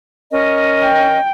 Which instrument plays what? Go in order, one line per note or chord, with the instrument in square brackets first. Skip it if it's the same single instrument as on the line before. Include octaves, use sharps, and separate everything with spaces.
[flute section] C#4 A#4 D#5
[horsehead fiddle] G5